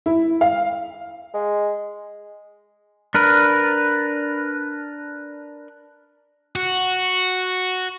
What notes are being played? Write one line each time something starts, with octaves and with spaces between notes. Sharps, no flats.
E4
F5
G#3
D4 A#4 B4
F#4